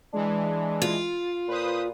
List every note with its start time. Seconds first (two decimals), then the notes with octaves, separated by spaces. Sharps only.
0.13 E3 G#3 D4
0.82 F4
1.48 A#2 B4 C5 D#6